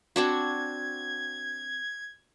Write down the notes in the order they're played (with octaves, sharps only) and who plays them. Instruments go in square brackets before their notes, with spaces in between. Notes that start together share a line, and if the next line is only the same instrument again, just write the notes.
[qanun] C4 D4 F#4 [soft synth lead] G#6